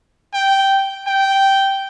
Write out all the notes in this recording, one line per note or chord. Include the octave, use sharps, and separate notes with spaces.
G5
G5